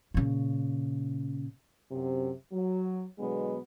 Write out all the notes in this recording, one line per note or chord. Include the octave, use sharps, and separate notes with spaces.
A#2 C#3
F#2 C3
F#3
B2 D3 F#3 G#3 B3